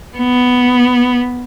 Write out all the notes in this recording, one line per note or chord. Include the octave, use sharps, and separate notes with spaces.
B3